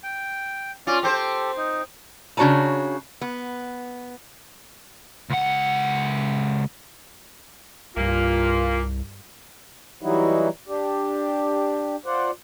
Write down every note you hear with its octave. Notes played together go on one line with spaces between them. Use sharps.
G5
C#4 F4 D5
C4 G4 A4 C5
D#4
C#3 D4 F#4 C#5 A5 A#5
B3
C#2 F#5
C2 G2 A#2 A#3 F4
E3 F#3 G3 D#4 E4 F#4
D4 G4
F4 C5 D5 F#5